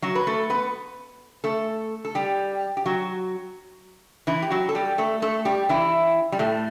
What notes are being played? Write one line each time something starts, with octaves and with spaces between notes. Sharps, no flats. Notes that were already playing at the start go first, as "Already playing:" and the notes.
F#3 F#4
B4
A3 A4
B3 B4
A3 A4
A4
G3 G4
G4
F#3 F#4
E3 E4
G4
F#3 F#4
A4
G3 G4
A3 A4
A3 A4
G3 G4
E3 E4
G3
A2 A3